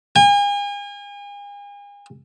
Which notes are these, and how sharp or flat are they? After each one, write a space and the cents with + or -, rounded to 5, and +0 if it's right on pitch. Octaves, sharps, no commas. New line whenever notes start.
G#5 -40